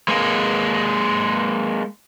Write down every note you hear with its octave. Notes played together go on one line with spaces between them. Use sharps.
G#3 A#3